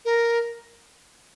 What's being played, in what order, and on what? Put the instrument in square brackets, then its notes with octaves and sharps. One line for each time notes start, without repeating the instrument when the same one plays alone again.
[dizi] A#4